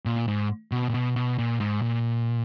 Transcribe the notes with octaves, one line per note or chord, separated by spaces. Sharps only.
A#2
G#2
B2
A#2
B2
B2
A#2
G#2
A#2